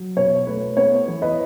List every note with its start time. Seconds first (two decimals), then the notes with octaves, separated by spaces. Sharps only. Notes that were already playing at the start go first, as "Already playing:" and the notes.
Already playing: F#3
0.16 B2 C#5
0.47 A3 B4
0.77 B3 C#5
1.08 E3
1.22 B4 D#5